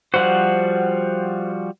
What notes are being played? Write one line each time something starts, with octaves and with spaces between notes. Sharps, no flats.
F3 G3 F#4 C5 F#5